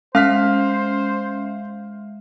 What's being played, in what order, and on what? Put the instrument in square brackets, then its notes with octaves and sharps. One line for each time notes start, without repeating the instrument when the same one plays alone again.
[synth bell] G#3 E5 [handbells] C#4 [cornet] C5 [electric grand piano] F5 F6 B6